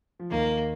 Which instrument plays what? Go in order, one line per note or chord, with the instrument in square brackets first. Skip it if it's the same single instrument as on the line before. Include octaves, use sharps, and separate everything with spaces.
[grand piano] F3
[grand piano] D#2 D#3 [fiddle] A#3